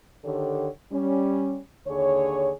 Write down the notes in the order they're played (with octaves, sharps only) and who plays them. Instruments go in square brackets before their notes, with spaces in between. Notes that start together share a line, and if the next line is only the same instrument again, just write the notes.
[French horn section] D3 D#3 G4 A4 C#5
G3 C#4
D#2 D3 G#4 C#5